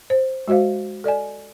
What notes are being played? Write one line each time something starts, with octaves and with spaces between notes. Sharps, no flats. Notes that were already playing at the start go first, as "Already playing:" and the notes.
C5
G#3 F#4 C5 D#5 F5
A4 D5 D#5 G#5